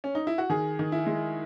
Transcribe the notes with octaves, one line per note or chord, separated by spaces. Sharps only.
C#4
D#4
E4
F#4
D#3 G#4
D#3
E4
G#3